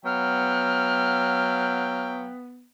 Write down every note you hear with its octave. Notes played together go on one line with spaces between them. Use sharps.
F#3 B3 F5 G5 F6